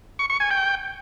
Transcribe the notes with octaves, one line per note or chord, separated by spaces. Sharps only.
C#6
C#6
G#5
G5